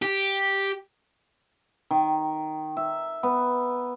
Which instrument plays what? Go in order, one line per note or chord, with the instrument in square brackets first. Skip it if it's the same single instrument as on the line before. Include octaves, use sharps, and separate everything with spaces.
[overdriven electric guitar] G4
[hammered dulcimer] D#3
E5
B3